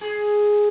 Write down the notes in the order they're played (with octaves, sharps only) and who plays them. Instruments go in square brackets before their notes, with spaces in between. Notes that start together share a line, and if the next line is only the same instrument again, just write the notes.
[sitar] G#4